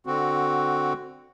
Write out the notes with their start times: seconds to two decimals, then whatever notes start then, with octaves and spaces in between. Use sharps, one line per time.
0.06 D3 C4 F#4